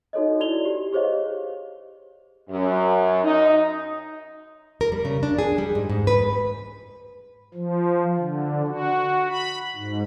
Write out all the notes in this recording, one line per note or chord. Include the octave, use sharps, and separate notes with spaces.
D#4 F#4 A4 C#5 D#5
E4 F#4 D5 F7 G7
G4
G4 G#4 C5 C#5 D#5 F5
F#2
D#4
A#4
G3
C#3
D4
G#4
G3
G#2
G#2
B4
F3
D3
F#4
B5
G#2